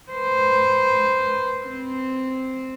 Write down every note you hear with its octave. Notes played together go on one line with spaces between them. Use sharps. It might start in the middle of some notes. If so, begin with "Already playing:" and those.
B4 C5
C4